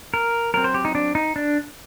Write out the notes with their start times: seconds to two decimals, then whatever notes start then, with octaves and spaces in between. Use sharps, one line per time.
0.14 A#4
0.54 F#3 C4 A#4
0.64 C5
0.74 G4
0.85 D#4
0.95 D4
1.15 D#4
1.36 D4